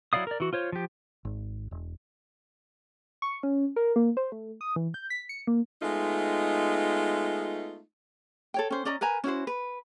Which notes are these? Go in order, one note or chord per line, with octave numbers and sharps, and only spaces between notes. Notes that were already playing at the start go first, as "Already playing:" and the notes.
F#3 E4 D5 F5 D#6
A#4 D5
E3 F#4
F4 C5 C#5
F3 G4
G#1
E1
C#6
C#4
A#4
A#3
C5
A3
D#6
E3
G6
B6
C#7
A#3
G#3 A3 B3 D#4 F4
A4 C#5 G5
C#4 C5
C#4 D5 D#5 A#5
A#4 B4 G#5 A#5
C#4 E4 F#4 C5
B4